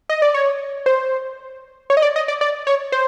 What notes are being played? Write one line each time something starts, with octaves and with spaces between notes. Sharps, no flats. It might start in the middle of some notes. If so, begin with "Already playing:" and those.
D#5
D5
C#5
C5
C#5
D#5
D5
D#5
D5
D5
C#5
C5